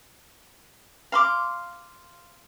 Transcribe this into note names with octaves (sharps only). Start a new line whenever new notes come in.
F5 C6 D6